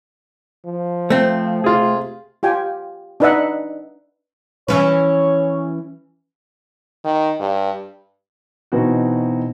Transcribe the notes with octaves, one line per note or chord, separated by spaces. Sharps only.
F3
A3 C4
C3 F4 G#4
F4 G4 G5 G#5
D4 D#4 B4 D#5 E5 F#5
E3 C#4 B4 C#5
D#3
G2
B2 E3 C4 D#4 F#4